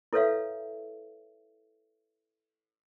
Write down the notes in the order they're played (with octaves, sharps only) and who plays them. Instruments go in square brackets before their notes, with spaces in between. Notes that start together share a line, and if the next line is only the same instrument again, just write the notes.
[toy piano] E4 A4 B4 C#5 E5 F5